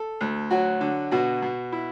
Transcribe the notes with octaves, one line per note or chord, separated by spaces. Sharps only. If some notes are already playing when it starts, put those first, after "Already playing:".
Already playing: A4
D2
F#3 F#4
D3
B2 F#4
B2
E4